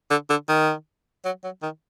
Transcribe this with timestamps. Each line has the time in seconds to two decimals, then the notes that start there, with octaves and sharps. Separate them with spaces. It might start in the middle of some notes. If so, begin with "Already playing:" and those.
0.10 D3
0.29 D3
0.48 D#3
1.25 F#3
1.44 F#3
1.62 D#3